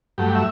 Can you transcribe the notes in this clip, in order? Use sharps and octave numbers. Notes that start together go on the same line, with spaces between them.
G2 F#3 A3 G4
E5